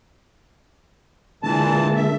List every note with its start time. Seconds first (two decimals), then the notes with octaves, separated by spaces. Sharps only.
1.43 A#2 D3 E3 G#3 A#3 A5
1.95 E5